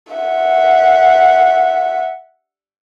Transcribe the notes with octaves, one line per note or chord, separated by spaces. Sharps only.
E5 F#5